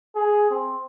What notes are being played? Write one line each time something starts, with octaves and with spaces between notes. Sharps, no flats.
G#4
C4